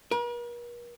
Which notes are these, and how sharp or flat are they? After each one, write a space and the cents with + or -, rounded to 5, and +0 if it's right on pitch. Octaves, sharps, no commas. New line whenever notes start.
A#4 +45